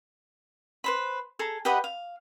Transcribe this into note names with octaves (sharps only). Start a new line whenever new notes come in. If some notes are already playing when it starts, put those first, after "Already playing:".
B4 C5 B5
G#4 A4 A5 A#5
G4 B4 D#5 F#5
F5